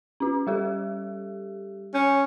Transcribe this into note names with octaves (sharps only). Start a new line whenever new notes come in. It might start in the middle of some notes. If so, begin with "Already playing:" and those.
C#4 F4
G3 G4 A4
C#4 G6